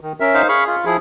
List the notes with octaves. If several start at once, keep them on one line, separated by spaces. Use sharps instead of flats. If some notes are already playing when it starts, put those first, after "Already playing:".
D#3
C#4 A#4 E5
D#4 C5 F5
G#4 F5 B5 C#6
F4
F3 E4 G#4